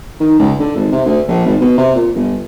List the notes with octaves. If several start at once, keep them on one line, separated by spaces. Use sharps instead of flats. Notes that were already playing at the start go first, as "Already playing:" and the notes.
D#3
C#2
D3
G#1
C3
D2
A#1
G#1
B2
C3
A#2
G1